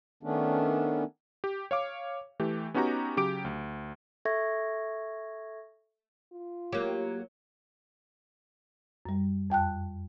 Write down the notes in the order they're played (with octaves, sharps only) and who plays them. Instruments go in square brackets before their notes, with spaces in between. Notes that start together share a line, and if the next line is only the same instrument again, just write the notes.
[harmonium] D#3 A3 B3 C#4 D4
[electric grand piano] G4
C#5 F5 D6
E3 A3 G4
B3 C#4 D#4 F#4 G4 A#5
C#3 F#3 G4 D6 D7
D2
[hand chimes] A4 E5 C#6 G#6 A#6
[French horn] F4
[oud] F#3 A#3 [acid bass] G4
[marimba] F#2 G3
F2 G5 A5 F#6